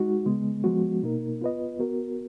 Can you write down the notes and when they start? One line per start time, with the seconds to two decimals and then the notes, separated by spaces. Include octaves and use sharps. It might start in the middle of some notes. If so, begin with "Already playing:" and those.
Already playing: G#3 D#4 F#4
0.26 C#3 G#3 B3
0.64 F3 G#3 B3 F#4
1.03 B2 A#3 D#4 A#4
1.41 B3 F4 B4 D#5
1.79 B3 F#4 A#4